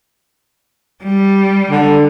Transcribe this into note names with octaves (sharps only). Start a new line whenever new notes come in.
G3
D3